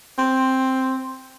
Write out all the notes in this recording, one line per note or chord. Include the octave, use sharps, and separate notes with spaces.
C4